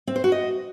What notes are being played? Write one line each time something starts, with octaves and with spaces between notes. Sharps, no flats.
C4
C5
F#4
D#5